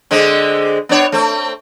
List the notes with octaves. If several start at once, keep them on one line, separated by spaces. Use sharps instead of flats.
D3 G#3 C4
B3 D4 C#5
A3 C4